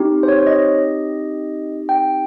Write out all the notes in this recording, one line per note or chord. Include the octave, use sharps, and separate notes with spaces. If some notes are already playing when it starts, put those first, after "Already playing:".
Already playing: C4 D#4 G4
C5
C#5
C#5
D#5
G5